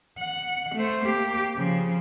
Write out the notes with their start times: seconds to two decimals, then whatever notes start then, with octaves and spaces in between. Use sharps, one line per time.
0.19 F#5
0.75 A3 C5
1.04 A#3 G4
1.57 C#3 F3